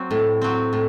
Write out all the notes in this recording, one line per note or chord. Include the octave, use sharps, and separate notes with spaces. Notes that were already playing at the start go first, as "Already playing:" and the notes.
Already playing: F#3 C4
A2
F#3 C4
A2